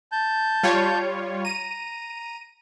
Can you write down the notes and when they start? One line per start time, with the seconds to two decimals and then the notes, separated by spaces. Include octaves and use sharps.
0.12 A5 G6
0.63 G3 F4 C#5
1.45 A#5 D#7